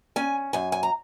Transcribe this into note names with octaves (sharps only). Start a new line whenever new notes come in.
C#4 G#5
F#2 G#5
G#5
A#5